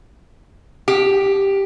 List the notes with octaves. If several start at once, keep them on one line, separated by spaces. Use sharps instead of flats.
G4